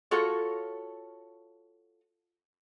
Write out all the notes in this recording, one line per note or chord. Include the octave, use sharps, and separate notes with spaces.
F4 F#4 A4 C#5